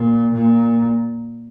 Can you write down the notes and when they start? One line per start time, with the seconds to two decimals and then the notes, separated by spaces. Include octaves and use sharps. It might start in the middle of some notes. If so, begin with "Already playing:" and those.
Already playing: A#2
0.33 A#2